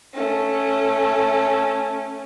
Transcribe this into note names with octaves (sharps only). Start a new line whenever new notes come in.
A3 C#4